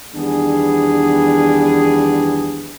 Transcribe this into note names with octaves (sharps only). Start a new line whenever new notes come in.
E2 D#3 G3 B3 D4 G#4